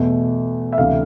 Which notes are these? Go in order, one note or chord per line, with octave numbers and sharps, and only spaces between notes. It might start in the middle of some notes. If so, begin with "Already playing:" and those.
Already playing: E2 B2 A3
E5
D2 C3 E3 F5